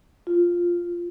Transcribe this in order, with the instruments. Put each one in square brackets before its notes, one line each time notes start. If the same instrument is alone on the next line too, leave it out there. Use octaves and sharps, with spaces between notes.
[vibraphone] F4